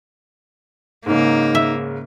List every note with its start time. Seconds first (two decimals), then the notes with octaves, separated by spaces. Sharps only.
1.06 G#2 C#3 A#3 D#4
1.55 E5